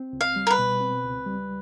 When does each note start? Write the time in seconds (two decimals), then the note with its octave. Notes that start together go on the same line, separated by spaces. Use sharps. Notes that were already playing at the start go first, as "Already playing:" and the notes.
Already playing: C4
0.13 C#2
0.21 F5
0.36 G3
0.47 A#4
0.50 B4
0.59 B2
0.81 C4
1.04 C#2
1.26 G3